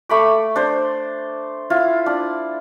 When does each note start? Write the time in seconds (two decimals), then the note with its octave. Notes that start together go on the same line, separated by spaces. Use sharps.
0.09 A3 B5 D6
0.56 D4 C5
1.70 E4 F4
2.06 D4